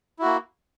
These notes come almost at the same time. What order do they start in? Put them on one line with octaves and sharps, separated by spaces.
E4 F#4 A#3